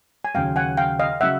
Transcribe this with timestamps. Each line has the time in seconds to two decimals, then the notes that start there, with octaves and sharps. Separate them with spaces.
0.25 G#5
0.34 D#2 C#3 F#3 F5 G5
0.56 F#5 G#5
0.77 F5 G5
0.99 D#5 F5
1.21 C#3 F#3 E5 F#5